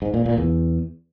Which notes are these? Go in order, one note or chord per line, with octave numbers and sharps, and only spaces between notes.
G#2
A#2
A#2
E2